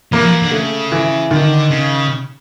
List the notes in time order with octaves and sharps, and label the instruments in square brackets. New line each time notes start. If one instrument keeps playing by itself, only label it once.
[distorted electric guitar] E3 [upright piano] A#3
[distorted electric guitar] F3
E3
D3
[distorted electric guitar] C#3 [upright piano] A3
[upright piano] E3
[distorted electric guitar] D3 [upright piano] D#3
[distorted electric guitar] C#3